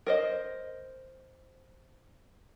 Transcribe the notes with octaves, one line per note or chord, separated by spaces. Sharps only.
A#4 C5 D#5